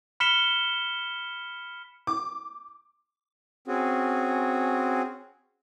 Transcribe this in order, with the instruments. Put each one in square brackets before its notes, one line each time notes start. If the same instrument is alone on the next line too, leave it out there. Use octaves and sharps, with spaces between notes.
[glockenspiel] B5 F6 B6 C#7 E7 G7
[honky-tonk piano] D6
[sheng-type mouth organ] C4 C#4 F#4 G#4